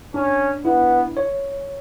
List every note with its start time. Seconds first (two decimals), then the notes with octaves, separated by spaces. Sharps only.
0.14 C#4 D4
0.65 B3 E4
1.17 C#5